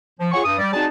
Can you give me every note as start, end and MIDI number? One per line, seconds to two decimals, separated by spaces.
0.20 0.29 53
0.32 0.44 65
0.32 0.44 68
0.32 0.44 73
0.32 0.44 78
0.32 0.44 80
0.32 0.44 85
0.44 0.56 43
0.44 0.56 87
0.59 0.70 55
0.59 0.70 74
0.73 0.86 60
0.73 0.86 63
0.73 0.86 66
0.73 0.86 68
0.73 0.86 74
0.73 0.86 81